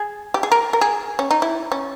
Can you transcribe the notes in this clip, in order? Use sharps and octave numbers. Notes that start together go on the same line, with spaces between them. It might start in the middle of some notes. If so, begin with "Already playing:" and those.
Already playing: G#4
G4
G#4
A#4
A#4
G#4
C#4
D#4
E4
C#4